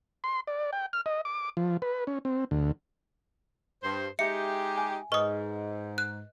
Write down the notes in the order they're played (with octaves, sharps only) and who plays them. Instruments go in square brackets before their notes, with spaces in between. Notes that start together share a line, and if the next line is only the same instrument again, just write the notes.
[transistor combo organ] C6
D5
G5
F6
D#5
D6
F3
B4
C#4
C4
D2
[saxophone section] G2 C5
[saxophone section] G#3 D#4 G4 [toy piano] E5 [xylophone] C#7
[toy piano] G#5
[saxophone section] G#2 [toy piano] B4 D#5 [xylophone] C#6 D#6
[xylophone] F#6